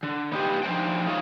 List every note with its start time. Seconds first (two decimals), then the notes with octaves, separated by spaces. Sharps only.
0.03 D3
0.32 B3 D#4 F4 G4 B4
0.63 F3 D4 D#4 C5 G5
1.06 D#4 F4 C#5